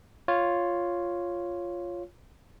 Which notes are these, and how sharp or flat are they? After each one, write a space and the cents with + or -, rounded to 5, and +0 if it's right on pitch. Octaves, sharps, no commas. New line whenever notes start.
F4 +0 C#5 +0